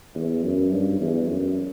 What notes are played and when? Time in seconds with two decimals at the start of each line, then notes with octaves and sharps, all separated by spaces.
0.15 E2
0.43 F#2
0.72 G2
1.00 E2
1.29 F#2